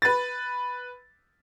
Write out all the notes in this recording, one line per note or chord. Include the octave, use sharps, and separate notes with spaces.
B4 A6